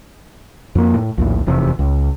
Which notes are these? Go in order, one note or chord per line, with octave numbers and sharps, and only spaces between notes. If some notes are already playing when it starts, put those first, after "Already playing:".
F2 A#3
A2
A#1 D#2 A2
F1 E2 C3
C#2